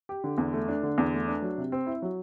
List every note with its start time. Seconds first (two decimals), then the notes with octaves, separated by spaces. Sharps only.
0.09 G4
0.24 D3
0.38 E2
0.53 A3
0.68 D4
0.83 D3
0.98 E2
1.13 A3
1.28 D4
1.42 F#3
1.58 C3
1.72 C4
1.87 E4
2.02 F#3